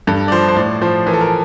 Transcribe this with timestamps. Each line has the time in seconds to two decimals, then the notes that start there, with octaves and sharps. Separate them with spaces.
0.07 G2 A4
0.28 D5
0.32 F3 C5
0.49 C5
0.56 A2 D5
0.81 F3 C5
1.06 E3 A#4
1.13 A4
1.21 A#4